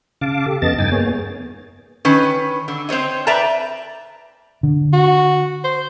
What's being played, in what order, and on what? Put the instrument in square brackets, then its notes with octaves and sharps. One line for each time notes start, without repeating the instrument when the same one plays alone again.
[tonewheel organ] C#3 F5 A5 D6
G4 A4
F2 C#3 B3 D#5 A5 A6
G2 D#4 G5 G#5 A6
A#3 B3 G#4 C#5
[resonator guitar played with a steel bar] D#3 C#4 B4
D3
C4 C5 C#5 D#5
B4 D5 E5 G5 A5 A#5
[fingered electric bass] D3
[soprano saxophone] F#4
C5